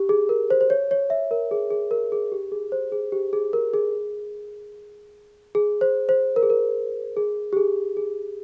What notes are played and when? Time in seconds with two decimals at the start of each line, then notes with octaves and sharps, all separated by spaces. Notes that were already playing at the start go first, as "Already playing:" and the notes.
Already playing: G4
0.09 G#4
0.29 A#4
0.50 C5
0.61 C5
0.70 C#5
0.91 C#5
1.10 E5
1.31 A#4
1.51 G#4
1.71 G#4
1.91 A#4
2.12 G#4
2.32 G4
2.52 G#4
2.72 C5
2.92 G#4
3.12 G4
3.33 G#4
3.53 A#4
3.74 G#4
5.55 G#4
5.81 C5
6.09 C5
6.36 A#4
6.43 G#4
6.50 A#4
7.17 G#4
7.53 G4
7.57 G#4
7.97 G#4